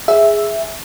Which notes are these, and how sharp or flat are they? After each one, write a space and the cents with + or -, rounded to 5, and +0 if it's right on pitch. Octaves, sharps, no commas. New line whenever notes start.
G#4 +0 E5 +0